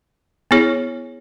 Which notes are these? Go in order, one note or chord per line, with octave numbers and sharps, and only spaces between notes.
B3 E4 G#4 C#5